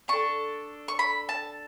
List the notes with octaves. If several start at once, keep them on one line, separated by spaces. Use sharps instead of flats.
D4 A4 C#6
C#6
B5
A5